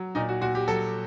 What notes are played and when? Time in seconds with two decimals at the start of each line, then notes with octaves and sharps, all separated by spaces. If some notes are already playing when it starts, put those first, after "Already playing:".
Already playing: F#3
0.15 A#2 D#4
0.29 F#4
0.41 A#2 F#4
0.55 G4
0.68 F#3 A4